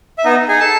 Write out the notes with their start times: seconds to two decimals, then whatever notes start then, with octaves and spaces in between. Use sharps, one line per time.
0.18 E5
0.25 B3 D#4 D#5
0.48 D#4 G#4 G#5
0.60 A4 A5